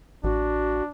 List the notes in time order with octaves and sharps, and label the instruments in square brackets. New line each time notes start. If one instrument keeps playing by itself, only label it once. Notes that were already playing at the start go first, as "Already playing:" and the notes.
[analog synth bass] A1 [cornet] D4 [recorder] F#4